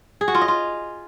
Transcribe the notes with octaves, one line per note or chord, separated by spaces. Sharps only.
G#4
F#4
F4
D#5
F4